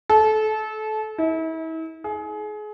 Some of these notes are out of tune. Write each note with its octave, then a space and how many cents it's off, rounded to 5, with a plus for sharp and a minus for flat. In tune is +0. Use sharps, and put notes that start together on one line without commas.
A4 -25
E4 -40
G#4 +30